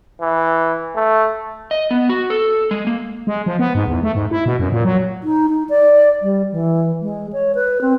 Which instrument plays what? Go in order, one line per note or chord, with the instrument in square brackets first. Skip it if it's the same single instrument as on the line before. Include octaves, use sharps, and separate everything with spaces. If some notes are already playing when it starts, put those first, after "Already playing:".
[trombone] E3
A3
[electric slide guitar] D#5
B3
F#4
A4
G#3
A#3
[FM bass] G#3
F3
B3
G#2
E2
A3
G#2
E4
B2
F#2
A#2
F#3
[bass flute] D#4
D#4
D5
G3
E3
G#3
C#5
B4
C4